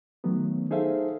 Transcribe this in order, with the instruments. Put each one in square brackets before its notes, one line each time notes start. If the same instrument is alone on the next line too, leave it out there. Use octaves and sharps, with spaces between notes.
[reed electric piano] D#3 F#3 A3 B3
D#4 G#4 A4 C5 E5 F5